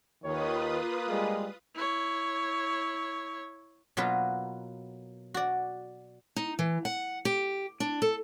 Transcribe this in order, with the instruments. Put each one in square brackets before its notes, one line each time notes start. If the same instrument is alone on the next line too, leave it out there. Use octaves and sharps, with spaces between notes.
[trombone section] D#2 D#3 [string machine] F4 B4 D#6 [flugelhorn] C#5
[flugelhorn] A#3
[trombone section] G3 G#3
[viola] E4 C#5
[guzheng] B2 F#3 A#3 F4 B4
F#4 D5
[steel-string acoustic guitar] D#4
E3
F#5
G4
D4
A4